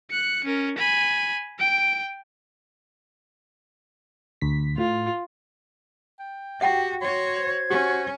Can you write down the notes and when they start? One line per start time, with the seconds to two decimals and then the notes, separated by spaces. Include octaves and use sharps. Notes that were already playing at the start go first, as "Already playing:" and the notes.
0.10 F#6 C#7
0.44 C#4 A#4
0.78 G#5 B5
1.59 G5 D7
4.41 D2 B6
4.78 A2 F4
6.19 G5
6.61 F#4 G4 E5 F#5 G5
7.01 F#4 C#5 C6
7.35 C5 G#6
7.70 C#4 F#4 G4